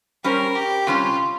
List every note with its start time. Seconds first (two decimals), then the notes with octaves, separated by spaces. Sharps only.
0.24 G3 C#4 G4 A#4 C5
0.55 G4
0.87 C3 G3 C#4 F4